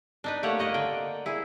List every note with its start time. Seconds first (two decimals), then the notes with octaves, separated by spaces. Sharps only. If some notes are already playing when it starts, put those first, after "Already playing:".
0.24 D4 D#4 B4
0.43 A3 A#3 G4 C#5 F#5
0.59 A#3 D#5 F#5
0.74 D3 G5
1.26 E4 G#4